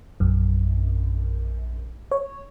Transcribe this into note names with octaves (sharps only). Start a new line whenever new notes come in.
A#1 F#2
C#5